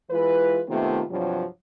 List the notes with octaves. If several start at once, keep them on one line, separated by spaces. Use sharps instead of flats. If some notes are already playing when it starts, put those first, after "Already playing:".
E3 G#3 F4 B4
C3 D#3 A3 B3 F4
G2 C3 F3 F#3